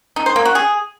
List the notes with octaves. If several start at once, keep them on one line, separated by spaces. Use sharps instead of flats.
D#4
C5
A#3
F#4
G#4